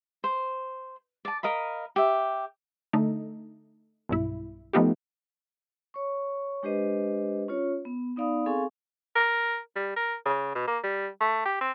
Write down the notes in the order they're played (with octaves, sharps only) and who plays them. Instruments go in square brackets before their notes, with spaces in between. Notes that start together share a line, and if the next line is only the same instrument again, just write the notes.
[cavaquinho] C5
D5 A5
A#4 D#5 F5 B5
G4 E5
[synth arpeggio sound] D3 A3 D#4
B1 G2 E4
F3 A3 B3 D#4 F4 G4
[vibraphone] C#5 C#6
G#3 D4 G4 B4 C5 D#5
C#4 F4 C#5
B3
B3 D#4 D5 F5 B5 D#6
C4 G#4 A4 F5 G#5 C#6
[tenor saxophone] A#4
G3
A#4
C#3
B2
A#3
G3
A3
G4
C4